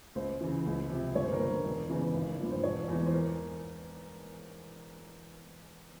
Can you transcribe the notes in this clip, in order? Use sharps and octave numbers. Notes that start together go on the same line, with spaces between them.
C#2 C5
C#3 E3
C#2
C3 F3
G1 C#5
C5
A#4
G2 F3 C5
E1
E2 C#3 E3
G#1
G2 F3
C5
E1 C#5
E2
E3
C5
A#4